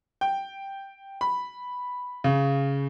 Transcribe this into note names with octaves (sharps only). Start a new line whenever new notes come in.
G5
B5
C#3